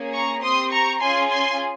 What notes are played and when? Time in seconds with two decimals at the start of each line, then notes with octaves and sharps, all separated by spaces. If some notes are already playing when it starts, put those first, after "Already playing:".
Already playing: A#3 C#4 G#4
0.13 A#5 C#6
0.42 C4 G4 C6 D#6
0.71 A#5 C#6
1.01 C#4 F4 G#4 G#5 C6
1.30 G#5 C6